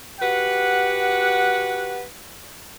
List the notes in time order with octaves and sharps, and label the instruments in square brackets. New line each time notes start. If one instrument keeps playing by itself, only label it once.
[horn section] F#4 G4 B4 F#5